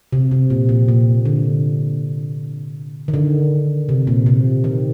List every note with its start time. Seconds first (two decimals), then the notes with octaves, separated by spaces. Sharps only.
0.13 C3
0.31 C3
0.50 A#2
0.69 A#2
0.88 A#2
1.25 D3
3.08 D#3
3.14 D3
3.89 C3
4.07 A#2
4.26 C3
4.64 D#3